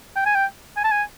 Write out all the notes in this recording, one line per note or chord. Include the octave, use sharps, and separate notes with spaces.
G5
G#5
G5
G#5
A5
G#5